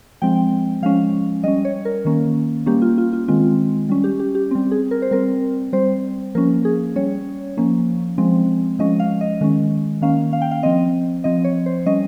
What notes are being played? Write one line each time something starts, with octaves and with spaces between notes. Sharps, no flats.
F3 G#3 C4 G5
F3 G#3 C#4 F5
G3 C#4 D#5
C#5
A#4
D#3 A#3 C#4
G3 A#3 C#4 G4
F4
F4
F4
D#3 G#3 C4 F4
G3 C#4
G4
G4
G4
G3 C4
G#4
A#4
C5
G3 C4 A#4
G3 C4 C5
F3 A#3 C#4 A#4
G#4
G3 C#4 C#5
F3 A#3 C#4
F3 G#3 C4
F3 G#3 C#4 D#5
F5
D#5
D#3 G#3 C#4
D#3 A#3 C#4 F5
F5
G5
F5
F3 C4 D#5
F3 C4 D#5
C#5
C5
G3 C#4 D#5